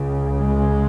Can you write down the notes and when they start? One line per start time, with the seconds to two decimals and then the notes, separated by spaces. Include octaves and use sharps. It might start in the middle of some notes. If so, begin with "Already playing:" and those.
Already playing: C#2 C#3
0.39 G#3